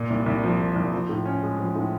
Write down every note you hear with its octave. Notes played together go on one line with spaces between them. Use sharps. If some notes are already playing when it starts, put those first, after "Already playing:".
Already playing: A#2
C2
C2
F3
A#2
C2
F3
A2
C#4
G#3
F3
A2